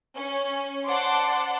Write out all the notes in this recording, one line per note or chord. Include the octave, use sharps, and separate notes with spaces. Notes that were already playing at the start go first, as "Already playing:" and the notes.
C#4
C5 D5 F#5 A5 C6 D6